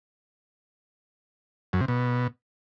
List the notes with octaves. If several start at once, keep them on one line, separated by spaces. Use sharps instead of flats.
F#2
C3
B2